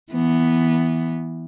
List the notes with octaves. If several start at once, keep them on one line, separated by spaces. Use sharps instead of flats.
E3 B3